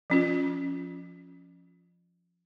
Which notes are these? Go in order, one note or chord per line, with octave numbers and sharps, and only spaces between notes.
F3 C#4 F4